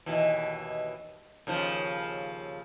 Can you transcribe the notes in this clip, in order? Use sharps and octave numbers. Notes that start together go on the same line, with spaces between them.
D#2 B2 E3
D#2 C#3 F3